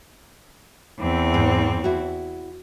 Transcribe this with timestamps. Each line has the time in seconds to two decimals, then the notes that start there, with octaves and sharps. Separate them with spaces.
0.98 E2 C4
1.34 G#2
1.84 E4 F#4